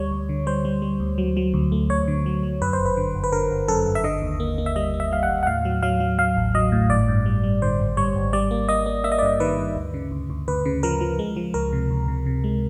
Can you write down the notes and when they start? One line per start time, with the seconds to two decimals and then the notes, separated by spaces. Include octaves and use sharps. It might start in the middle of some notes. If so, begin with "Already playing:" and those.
Already playing: D2 G3 C#5
0.11 D2
0.29 D3
0.47 G3 C5
0.65 G3
0.82 G3
1.00 D2
1.18 F#3
1.37 F#3
1.54 D2
1.72 A3
1.89 D2 C#5
2.08 D3
2.26 F#3
2.43 F#3
2.62 F#2 B4
2.73 C5
2.79 G1
2.86 B4
2.97 D3
3.15 G1
3.24 B4
3.32 D3 A#4
3.51 G1
3.68 F#2 A4
3.86 G1
3.95 E5
4.04 D3 D#5
4.22 D#2
4.40 A#3
4.58 A#3
4.66 E5
4.76 G3 D#5
4.94 A#3
5.00 E5
5.12 G3 F5
5.23 F#5
5.29 D#2
5.43 F#5
5.47 A2 F5
5.65 F#3
5.82 F#3 F5
6.00 F#3
6.18 F#3 F5
6.37 A1
6.54 F#3 D#5
6.72 A2
6.89 G#1 D5
7.08 G2
7.26 G3
7.43 G3
7.62 D3 C5
7.80 G#1
7.97 G3 C#5
8.16 G#1
8.33 G3 D5
8.51 A#3
8.69 A#3 D#5
8.86 A#3
9.04 A#3 E5
9.12 D#5
9.19 D5
9.22 G2 D#5
9.40 D#3 B4
9.58 G2
9.76 D2
9.94 C#3
10.11 D2
10.30 D2
10.48 D2 B4
10.65 C#3
10.83 F3 A#4
11.01 F3
11.19 G#3
11.36 F3
11.54 C#2 A#4
11.73 C3
11.90 C#2
12.08 C3
12.26 C3
12.44 G#3